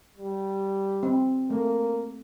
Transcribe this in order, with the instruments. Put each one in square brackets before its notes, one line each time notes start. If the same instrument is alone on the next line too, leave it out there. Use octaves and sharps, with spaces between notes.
[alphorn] G3
[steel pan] C4
[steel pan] A3 [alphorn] A#3